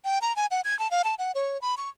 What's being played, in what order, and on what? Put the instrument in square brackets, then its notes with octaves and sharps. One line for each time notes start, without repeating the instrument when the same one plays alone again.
[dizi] G5
A#5
G#5
F#5
G#6
A5
F5
A5
F#5
C#5
B5
C#6